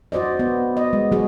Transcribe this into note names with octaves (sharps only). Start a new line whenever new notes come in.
F#4 C5 D5 D#5
B3
D#5
G#3
G3 G#3 F#4 G#4